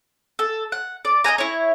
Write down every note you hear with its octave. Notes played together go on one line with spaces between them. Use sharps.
A4
F#5
D5
D#5 F#5 G#5 A#5
E4 C#5